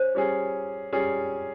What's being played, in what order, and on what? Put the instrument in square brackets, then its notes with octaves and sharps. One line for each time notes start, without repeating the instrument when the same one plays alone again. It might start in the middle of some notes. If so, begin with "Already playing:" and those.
Already playing: [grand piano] C#4 [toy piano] C5
[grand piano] G3 C#4 G#4
G3 C#4 G#4